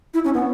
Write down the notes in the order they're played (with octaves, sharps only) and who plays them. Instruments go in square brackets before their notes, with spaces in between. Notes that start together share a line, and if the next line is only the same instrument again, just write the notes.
[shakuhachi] E4
C#4
B3